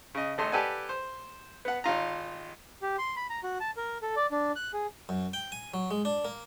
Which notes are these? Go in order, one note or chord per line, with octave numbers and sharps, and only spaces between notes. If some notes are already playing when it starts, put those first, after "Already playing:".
C#3 D#5
G#1 A3 D#5 C6
G4 A4 B4 D5 F#5 G#5
C5
B3 F#5
G#1 D#4 F4 A#5
G4
C6
B5
A#5
F#4
A5
A#4
A4
D5
D4
F#6
G#4
F#2
G5
G#5
F#3
G#3
D4
A#3